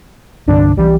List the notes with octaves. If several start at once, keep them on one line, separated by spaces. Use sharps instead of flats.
C2 G2 D3 D4
B1 E3 G3